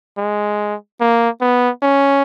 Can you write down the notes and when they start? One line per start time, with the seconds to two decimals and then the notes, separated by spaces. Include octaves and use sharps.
0.17 G#3
1.01 A#3
1.41 B3
1.83 C#4